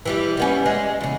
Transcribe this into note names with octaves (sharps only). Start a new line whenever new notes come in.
E3 G3 G4
G3 B3 C#4
G#3
E2 C#3